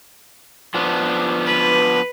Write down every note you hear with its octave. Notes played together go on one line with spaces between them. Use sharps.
F3 B3 D4
B4